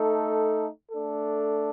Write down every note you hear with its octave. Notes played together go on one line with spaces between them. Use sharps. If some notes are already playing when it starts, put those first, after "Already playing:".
Already playing: A3 D#4 A4
A3 D4 A4